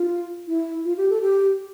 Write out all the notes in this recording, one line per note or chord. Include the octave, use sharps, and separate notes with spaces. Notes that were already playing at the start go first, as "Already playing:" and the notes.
Already playing: F4
E4
F4
G4
A4
G4